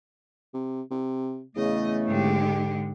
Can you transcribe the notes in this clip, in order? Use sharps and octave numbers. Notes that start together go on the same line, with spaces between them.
C3
C3
E2 C#3 A3 D#5
G#2 D3 G#3 G4